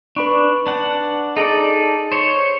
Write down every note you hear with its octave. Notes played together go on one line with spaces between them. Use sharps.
D4 B4 B5 C#6
D4 F#5
D#4 G#4 A4 D5 D#5
C5 C#5